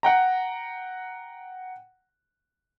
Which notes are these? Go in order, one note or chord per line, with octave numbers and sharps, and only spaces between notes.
F#5 G5 A#5